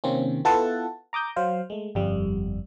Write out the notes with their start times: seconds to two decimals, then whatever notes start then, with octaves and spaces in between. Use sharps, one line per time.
0.04 C3 D#3 A#3 C4 C#4
0.45 B3 E4 F4 A4 F#5 A5
1.13 A#5 D6 D#6 G6
1.36 F#3 C5 F5
1.70 G#3 A3
1.95 G1 F2 G3